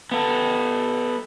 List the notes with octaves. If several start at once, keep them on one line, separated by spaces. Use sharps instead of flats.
B3 A4